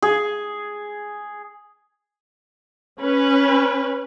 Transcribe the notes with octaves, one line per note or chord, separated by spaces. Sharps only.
G#4
C#4 B4